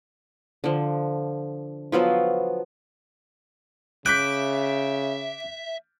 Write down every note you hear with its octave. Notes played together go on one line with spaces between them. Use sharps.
D3 F3
F3 F#3 B3 F4
C#3 E5 D6 F#6 G6 B6